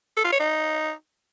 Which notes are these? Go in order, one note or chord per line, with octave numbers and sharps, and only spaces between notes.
A4
F4
C#5
D#4